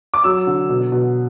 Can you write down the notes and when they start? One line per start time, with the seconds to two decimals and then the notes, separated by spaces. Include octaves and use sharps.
0.14 D6
0.24 F#3 E6
0.47 D3
0.69 B2
0.92 B2